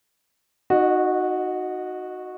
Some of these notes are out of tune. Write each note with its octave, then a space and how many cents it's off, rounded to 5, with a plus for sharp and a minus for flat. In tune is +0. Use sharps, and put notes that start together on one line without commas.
D#4 +0 F#4 -10 D#5 -35